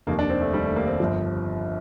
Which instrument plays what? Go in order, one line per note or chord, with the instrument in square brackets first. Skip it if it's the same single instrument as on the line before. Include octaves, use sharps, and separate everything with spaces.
[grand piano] F1 D#2 D#3 [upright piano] A#3
[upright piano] D4
C4
A3
G3
A3
A#3
C4
[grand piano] G1 G2 F3